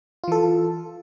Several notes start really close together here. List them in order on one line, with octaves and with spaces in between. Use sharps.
F4 E3 A4